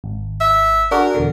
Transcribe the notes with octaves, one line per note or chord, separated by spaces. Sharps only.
G#1
E5
D4 F#4 G#4 A#4
E2 B2 D3